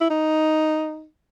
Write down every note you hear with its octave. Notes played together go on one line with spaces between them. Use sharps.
E4
D#4